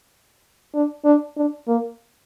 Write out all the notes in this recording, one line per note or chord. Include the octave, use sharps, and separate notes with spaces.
D4
D4
D4
A#3